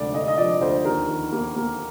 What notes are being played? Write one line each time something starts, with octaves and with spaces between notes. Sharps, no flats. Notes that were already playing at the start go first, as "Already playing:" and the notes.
Already playing: D2 C3 F3 G#3 D5
D2 D#5
D#5
F3 D5
D2 C5
D#2 A#4
D#3
A#3
A#3